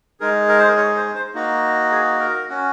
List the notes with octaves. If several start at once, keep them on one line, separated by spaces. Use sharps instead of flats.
G#3 D#4 G#4 A#4
A#4
C5
A#4
C#5
C5
C5
A#3 D#4 F#4
G#4
A#4
C#4 F#4